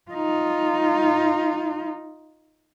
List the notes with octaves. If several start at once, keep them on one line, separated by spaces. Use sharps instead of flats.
D#4 F4